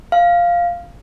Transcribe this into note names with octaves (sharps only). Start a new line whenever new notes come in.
F5